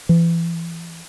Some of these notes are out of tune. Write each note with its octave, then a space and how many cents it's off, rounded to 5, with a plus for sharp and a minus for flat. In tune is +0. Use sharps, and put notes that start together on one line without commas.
E3 +30